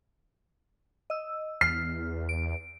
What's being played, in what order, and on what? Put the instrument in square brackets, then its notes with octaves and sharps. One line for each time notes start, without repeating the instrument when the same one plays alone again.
[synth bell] D#5 E6
[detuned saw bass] E2 [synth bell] F6 [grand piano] C7
[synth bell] D7